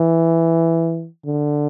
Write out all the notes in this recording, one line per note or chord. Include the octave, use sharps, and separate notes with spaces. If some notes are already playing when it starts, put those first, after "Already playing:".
Already playing: E3
D3